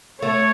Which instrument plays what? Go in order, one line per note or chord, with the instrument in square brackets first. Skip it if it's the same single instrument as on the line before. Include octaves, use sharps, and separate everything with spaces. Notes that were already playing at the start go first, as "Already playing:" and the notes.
[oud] A3 [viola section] C#5